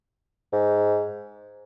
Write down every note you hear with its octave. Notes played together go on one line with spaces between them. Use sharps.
G#2